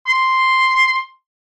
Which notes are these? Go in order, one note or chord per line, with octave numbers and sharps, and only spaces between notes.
C6